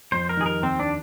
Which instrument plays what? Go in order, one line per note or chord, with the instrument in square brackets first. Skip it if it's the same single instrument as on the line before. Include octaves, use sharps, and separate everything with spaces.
[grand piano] F2 [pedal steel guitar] C5
[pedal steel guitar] A#4
[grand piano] D#3 G3 [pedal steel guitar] G#4
[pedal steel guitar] A#4
[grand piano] D#2 [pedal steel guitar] C4
[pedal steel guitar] D4